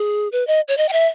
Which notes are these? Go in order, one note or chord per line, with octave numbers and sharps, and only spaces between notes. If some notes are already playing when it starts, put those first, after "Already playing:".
Already playing: G#4
B4
D#5
C#5
D#5
G5
E5